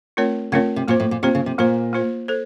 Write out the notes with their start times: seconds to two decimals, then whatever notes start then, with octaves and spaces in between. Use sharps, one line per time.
0.17 A3 C4 F4 A#4 C#5
0.52 C#3 A3 C4 F4 A#4 C#5
0.76 C3
0.88 A#2 A#3 F4 C5
1.00 A2
1.11 A#2
1.23 C3 A#3 F4 C5
1.35 C#3
1.46 C3
1.58 A#2 A#3 F4 C5
1.93 A#3 F4 C5
2.28 A4 C5